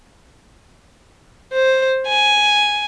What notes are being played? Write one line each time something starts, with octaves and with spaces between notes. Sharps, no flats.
C5
G#5